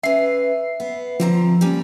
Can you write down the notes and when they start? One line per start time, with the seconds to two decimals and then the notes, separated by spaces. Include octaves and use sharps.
0.03 C#4 B4 E5 C7
0.80 B3
1.20 D3 F3 C4 A#5
1.61 G3 A#3 C#4